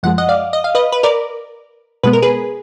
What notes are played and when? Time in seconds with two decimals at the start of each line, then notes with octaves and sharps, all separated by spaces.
0.03 F#2 F3 G#3 F#5
0.18 D#5 F#5
0.29 D5 F5
0.53 D#5
0.64 F5
0.75 B4 D#5
0.92 B4
1.03 A#4 D5
2.03 B2 G#3 B3 B4
2.13 A#4
2.22 G#4 B4